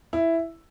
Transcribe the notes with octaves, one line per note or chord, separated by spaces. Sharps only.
E4